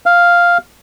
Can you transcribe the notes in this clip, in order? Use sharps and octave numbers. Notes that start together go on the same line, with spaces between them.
F5